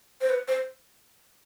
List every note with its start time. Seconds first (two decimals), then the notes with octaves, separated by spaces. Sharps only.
0.21 C5
0.29 B4
0.48 C5